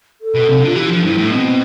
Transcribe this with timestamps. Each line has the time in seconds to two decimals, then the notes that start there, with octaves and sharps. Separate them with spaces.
0.21 A4
0.34 B2
0.49 C3
0.62 D3 F4
0.75 E3 G4
0.90 F3 D4
1.03 G2 E4
1.16 A2 E4
1.23 D4
1.31 B2 C4